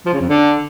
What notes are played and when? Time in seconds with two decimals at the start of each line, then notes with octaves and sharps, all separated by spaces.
0.06 F3
0.13 C#3
0.21 F2
0.28 D3